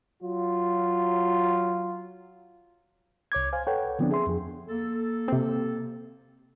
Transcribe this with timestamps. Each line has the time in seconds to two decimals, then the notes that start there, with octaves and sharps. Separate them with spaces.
0.22 F#3 F4
3.32 C2 C#5 D6 G#6
3.53 C5 F5 G#5
3.67 A4 B4 C#5 F#5 G5
3.99 D3 F3 B3 C4 D4
4.11 G#4 E5 C6
4.27 F2 F3 G#4
4.69 A#3 A4
5.28 C3 C4